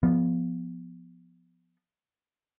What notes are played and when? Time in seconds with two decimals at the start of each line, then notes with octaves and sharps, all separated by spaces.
0.03 F3 B3